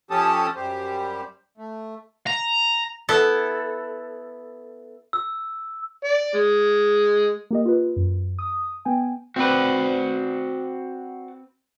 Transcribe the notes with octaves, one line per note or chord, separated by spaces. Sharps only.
F3 C#4 G4 A4 A5 D#6
F#2 G3 G4 C5
A3
A#5
B3 E4 A4
E6
D5
G#3
A#3 G4 D#5
F4 B4
F#2
D#6
B3 G5 G#5
C4 F#4 B4 C5 D5